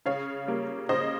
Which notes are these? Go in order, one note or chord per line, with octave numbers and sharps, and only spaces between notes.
C#3 C#5 F5
G3 A#3
C#3 C5 D#5